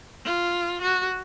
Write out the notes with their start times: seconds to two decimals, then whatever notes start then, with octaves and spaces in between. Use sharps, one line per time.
0.25 F4
0.82 F#4